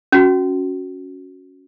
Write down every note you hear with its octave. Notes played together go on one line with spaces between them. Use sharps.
C#4 F#4